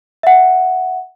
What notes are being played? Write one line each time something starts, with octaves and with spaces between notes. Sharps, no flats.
E5 F#5